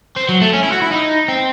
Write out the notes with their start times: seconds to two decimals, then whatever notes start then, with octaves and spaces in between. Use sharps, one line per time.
0.16 C4
0.29 F#3
0.41 A3
0.54 C#4
0.63 E4
0.72 F#4
0.82 E4
0.91 D#4
1.28 C4